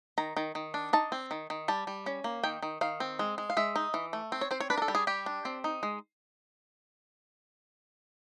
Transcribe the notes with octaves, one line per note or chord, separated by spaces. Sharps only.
D#3 A#5
D#3
D#3
D4
D#4 A5
C4
D#3
D#3
G3 A5
G3
C#4
A#3
D#3 G5
D#3
D#3 F5
C4
G#3
G#3
F5
G#3 E5
D#4
E3
A3
C4
C#5
C4 C5
C#5
D4 B4
A#4
A4
G3
G#4
G3 G4
D4
C4
D#4
G#3